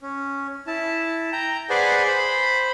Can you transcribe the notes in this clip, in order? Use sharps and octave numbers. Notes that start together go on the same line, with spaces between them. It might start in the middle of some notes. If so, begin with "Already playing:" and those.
C#4
E4 A5
G5 A#5
G#4 B4 C5 D5 F#5 G#5
C5 B5